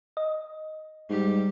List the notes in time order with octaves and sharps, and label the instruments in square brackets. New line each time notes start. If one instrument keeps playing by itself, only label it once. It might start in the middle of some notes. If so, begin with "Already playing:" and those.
[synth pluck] D#5
[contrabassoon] G#2 [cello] G3 G4